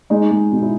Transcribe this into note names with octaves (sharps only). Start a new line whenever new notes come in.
G#3 D#4
G#3
B2
E4